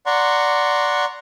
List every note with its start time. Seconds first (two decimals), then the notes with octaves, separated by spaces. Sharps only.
0.06 D5 F#5 A#5 C6 C#6